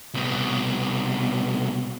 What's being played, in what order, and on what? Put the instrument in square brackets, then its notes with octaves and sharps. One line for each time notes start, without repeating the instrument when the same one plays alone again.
[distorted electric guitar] C2 B2